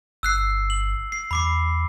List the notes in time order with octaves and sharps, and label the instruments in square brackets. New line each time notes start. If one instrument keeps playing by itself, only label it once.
[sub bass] G1 [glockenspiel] E6 F#6 C7
[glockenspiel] F#7
C7
[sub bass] E2 [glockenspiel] B5 D6 C7